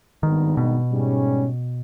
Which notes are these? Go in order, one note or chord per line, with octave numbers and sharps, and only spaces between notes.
G#1 G2 D#3 G3 B3 D#4
B2
G#2 G3 C#4